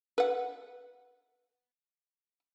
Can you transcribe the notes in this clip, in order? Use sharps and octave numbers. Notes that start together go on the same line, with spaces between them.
B4 F#5